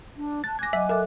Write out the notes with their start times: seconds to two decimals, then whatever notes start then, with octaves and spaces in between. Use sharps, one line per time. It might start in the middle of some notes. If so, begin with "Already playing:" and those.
0.17 D4
0.44 A5 F#6 A6
0.59 G#5 D6 F#6 G#6 A#6
0.73 F#3 D#5 E5
0.89 A4 A#4 E5